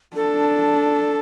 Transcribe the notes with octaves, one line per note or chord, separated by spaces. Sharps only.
D4 A4